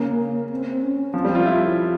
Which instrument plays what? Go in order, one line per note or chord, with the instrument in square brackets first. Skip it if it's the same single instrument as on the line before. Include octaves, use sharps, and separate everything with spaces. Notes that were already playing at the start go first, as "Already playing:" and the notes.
Already playing: [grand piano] C#3 [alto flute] A#3
[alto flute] C4
C4
C#4
[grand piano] F3 [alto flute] C4
[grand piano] G3
F4
E4